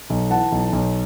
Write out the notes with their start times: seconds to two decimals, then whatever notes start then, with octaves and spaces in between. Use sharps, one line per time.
0.10 B1
0.30 E3 F#5 A5
0.52 B1
0.73 B1